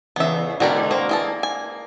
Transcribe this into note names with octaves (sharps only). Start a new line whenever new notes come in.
E2 C#3 E3 B3 E5
G#2 B2 D3 F#4 G4 A#4
A#3 C4 F#4
E3 G#4 A4
G#5